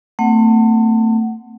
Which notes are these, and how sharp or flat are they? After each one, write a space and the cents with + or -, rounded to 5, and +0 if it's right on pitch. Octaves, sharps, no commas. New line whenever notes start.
A3 +30 C4 -25 F#5 +10